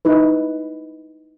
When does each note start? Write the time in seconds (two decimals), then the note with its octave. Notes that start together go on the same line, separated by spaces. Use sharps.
0.05 D#4 E4 B4